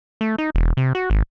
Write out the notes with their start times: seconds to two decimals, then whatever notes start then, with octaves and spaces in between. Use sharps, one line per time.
0.21 A3
0.38 D#4
0.55 E1
0.77 C3
0.95 F#4
1.10 G#1